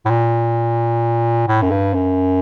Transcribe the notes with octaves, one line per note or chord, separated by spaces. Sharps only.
A2
A#2
A2
F#2
G2
F#2